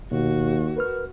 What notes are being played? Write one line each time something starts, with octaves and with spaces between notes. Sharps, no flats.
D#2 B2 F#4
A#4 B4 F6